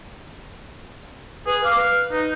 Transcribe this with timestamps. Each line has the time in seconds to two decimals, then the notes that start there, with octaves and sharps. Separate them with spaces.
1.46 G#4 B4
1.64 F5 D6
1.77 B4
2.12 D#4